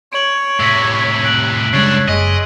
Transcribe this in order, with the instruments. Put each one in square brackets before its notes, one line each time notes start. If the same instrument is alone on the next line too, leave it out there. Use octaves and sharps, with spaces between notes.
[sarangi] C#5 [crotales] D7 F#7
[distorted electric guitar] A2 C3 [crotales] E6 A#6 B6
[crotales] F#6 D7 F#7
[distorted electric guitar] F#2 D4 [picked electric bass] C#3 G3 G#3 [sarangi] C#5 [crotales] C7 D7
[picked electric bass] F#1 [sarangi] G#3 [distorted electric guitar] D#5